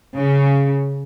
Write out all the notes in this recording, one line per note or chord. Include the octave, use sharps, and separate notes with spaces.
C#3